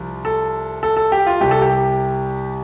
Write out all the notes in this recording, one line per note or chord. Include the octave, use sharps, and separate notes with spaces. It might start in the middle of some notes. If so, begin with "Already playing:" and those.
Already playing: C2 C3 F3
A4
A4
A4
G4
F4
C2 C3 G3 G4
A4
G4